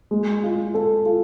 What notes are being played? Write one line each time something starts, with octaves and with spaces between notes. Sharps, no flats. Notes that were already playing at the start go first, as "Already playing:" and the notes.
G#3
F4
A4
F4